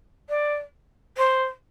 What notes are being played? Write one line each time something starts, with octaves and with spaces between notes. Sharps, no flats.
D5
C5